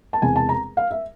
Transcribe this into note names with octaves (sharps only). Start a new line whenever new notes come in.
A5
E1 E2 C3 G#5
A5
A#5
F5
E5